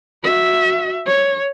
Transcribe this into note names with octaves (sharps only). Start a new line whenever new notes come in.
F#4 E5
C#5